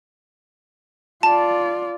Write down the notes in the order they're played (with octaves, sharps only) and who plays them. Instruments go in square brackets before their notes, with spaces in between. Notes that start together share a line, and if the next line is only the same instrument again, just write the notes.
[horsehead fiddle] F4 D5 [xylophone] A5